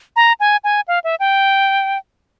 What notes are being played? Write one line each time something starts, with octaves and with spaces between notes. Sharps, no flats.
A#5
G#5
G#5
F5
E5
G5